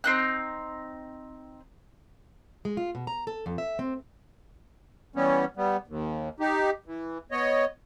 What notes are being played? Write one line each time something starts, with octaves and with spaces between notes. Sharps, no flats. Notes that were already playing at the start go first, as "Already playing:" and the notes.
C4 D#4 F#6
G#3
F4
B2
A#5
A4
F2
E5
C4
E3 G3 B3 C#4
G3 B3
D#2
D#4 G4
E3
B3 C#5 D#5